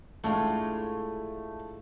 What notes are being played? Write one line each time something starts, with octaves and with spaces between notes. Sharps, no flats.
A2 G#3 A3 D4 F4